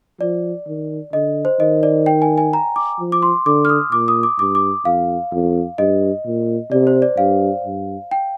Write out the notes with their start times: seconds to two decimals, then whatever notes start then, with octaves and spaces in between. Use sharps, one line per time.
0.21 F3 D5
0.67 D#3
1.13 D3 D#5
1.45 C5
1.60 D#3 D#5
1.83 D5
2.06 G5
2.22 G#5
2.38 G#5
2.53 A#5
2.76 D6
3.00 F3
3.12 D6
3.22 C6
3.46 D3 D6
3.65 F6
3.69 D#6
3.92 A#2 D6
4.08 D#6
4.23 D6
4.39 G2 D6
4.55 D6
4.85 F2 F5
5.32 F2
5.78 G2 D#5
6.25 A#2
6.71 C3 D5
6.87 C5
7.02 D5
7.17 G2 F5
7.64 G2
8.11 G5